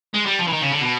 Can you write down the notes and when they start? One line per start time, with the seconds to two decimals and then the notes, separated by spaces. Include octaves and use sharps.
0.14 G#3
0.26 G3
0.39 F3
0.47 E3
0.53 D#3
0.62 C#3
0.71 D3
0.81 B2